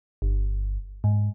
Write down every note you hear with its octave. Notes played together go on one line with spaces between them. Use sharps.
G1
G#2